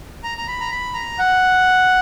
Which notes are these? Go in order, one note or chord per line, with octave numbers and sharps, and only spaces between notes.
A#5
A#5
B5
A#5
B5
A#5
F#5